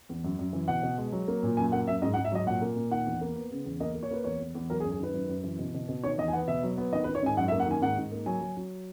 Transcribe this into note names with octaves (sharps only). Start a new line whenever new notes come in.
E2
F#2
F#2
E3
B2 F#5
B2
G#3
F#3
A#3
A#2
F#2 G#5
A#3 F#5
F#2 E5
G#2 D#5
F#5
G#2
E5
F#3 D#5
A#2 F#5
A#3
A#2
D#3 F#5
E2
A#3
B3
C#3
E2
A#3 D#5
A#3
C#5
A#3 B4
E2 C#5
E2
E2
F#3 A#4
G#4
F#2
G#4
D#3 B4
F#2
F#2
E3
B2
B2
B2
D#3 C#5
E2 D#5
G#5
B3 F#5
B2 E5
F#3
B3
D#3 D#5
B4
D#3
C#5
G#2 G#5
F#2 F#5
E5
A#3
F#5
D#3 G#5
G#2 F#5
G#2
A#3
F#3 G#5
F#3
F#3